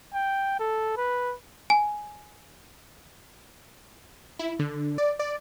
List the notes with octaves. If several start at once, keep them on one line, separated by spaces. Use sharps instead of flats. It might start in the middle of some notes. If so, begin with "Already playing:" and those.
G5
A4
B4
G#5
E4
D3
D5
D5